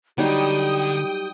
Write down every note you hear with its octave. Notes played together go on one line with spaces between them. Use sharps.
D3 F#3 G3 D#4 G4 G5 D#6